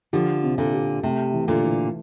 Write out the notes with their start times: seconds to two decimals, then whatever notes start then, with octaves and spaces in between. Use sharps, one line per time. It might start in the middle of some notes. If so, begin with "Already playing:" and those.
0.13 D3 F3 G4
0.43 C3
0.58 A#2 D3
0.73 G4
1.03 C3 A3
1.34 E3
1.48 A#2 D3
1.63 E3